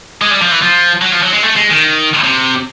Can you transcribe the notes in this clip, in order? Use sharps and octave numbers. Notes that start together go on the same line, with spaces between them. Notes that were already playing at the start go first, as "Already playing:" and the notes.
G#3
G3
F3
E3
F3
F#3
F3
F#3
G#3
A3
G#3
D#3
C3